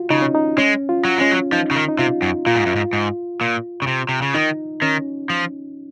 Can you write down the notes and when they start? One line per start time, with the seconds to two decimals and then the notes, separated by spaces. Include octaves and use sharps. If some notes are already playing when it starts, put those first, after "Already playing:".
Already playing: F4 F#4
0.11 C#3 D#4
0.22 C#4
0.35 D#4
0.58 G#3 C#4
0.89 F4
1.05 F#3
1.18 G#3 C#4
1.31 F#3
1.52 F3 D#4
1.71 C#3
1.76 D#3
1.88 D#4
1.99 C3 F4
2.22 F#2
2.47 A#2 F4
2.56 G#2
2.66 F#2
2.76 G#2
2.93 G#2
3.41 A#2
3.82 C#3
3.87 C3
4.09 C3
4.22 C#3
4.34 D#3 D#4
4.82 D#3 C#4
5.30 F3